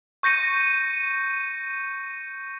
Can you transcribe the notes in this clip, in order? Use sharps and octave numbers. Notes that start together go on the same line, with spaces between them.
C#6 G6 A#6 C#7 D#7